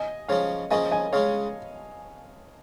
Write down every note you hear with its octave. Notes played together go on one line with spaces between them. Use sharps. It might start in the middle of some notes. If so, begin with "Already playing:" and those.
Already playing: D#5 G#5
C#3 F3 C#4 C#5 F5
C#3 F3 A#3 C#4 D#5 G#5
D#5 G#5
C#3 G#3 C#4 C#5 F5